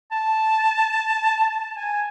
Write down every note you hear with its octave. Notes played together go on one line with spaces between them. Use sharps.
A5
G#5